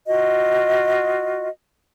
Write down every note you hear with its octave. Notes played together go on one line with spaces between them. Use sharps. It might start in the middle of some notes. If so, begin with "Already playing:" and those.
F4 F#4 D#5